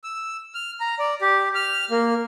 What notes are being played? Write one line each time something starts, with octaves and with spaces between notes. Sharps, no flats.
E6
F6
A#5
D5
G4
F6
A#3